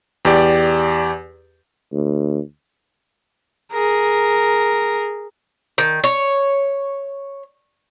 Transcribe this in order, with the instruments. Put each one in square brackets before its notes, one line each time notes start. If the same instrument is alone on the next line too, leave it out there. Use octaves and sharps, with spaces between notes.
[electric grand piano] E2 G4 D5
[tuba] D2
[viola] G#4 A#4
[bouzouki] D#3
C#5